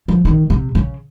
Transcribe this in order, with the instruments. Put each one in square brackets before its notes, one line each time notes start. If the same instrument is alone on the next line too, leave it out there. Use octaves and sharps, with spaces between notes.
[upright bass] F3
D#3
C3
C#3